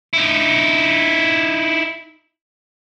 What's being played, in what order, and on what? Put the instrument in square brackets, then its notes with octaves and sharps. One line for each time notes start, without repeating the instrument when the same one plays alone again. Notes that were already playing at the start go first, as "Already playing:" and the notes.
[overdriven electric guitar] D#4 E4